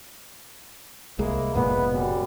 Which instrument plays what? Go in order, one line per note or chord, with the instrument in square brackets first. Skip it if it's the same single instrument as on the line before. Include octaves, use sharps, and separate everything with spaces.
[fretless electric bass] C2 G#3 [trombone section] A#3 E4
[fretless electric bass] F1 A#2 G#3 [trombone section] B3
[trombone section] F#2 B2 G3